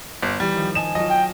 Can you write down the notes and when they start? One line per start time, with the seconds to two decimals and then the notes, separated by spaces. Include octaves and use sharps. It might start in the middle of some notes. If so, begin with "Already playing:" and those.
0.23 G1
0.40 E3 G3
0.54 D#3 F3
0.75 D#5 G#5 A5 E7
0.95 F#3 F4 D#5
1.10 G5